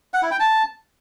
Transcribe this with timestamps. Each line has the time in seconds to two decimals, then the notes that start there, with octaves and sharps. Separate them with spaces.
0.14 F#5
0.22 E4
0.31 G5
0.40 A5